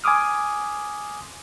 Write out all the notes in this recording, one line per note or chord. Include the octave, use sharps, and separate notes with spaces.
G#5 C6 D6 D#6 F6